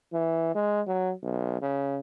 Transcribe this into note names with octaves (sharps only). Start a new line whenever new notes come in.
E3
G#3
F#3
B1
C#3